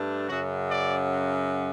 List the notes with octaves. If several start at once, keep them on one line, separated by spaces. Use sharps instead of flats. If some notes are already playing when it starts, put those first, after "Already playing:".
Already playing: G2 A3 D4
F#2 C#3 F#3 F#4
D5